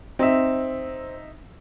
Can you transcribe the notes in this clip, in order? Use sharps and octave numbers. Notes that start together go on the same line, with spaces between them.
C4 D#4 E5